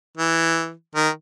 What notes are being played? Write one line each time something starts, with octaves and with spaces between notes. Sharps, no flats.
E3
D#3